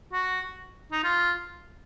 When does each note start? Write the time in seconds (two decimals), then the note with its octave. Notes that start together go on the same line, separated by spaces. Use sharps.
0.13 F#4
0.92 D#4
1.04 F4